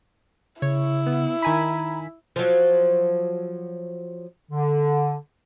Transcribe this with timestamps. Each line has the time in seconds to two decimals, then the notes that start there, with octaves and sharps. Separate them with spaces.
0.62 C#3 E4 C#5
1.06 B3
1.42 D#3 G#5 A#5 B5 B6
2.36 F3 F#3
4.51 D3